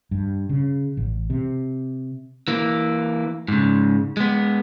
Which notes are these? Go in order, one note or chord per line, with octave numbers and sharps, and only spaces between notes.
G2
C#3
A1
C3
E3 A#3
G#2 C#3
G#3 B3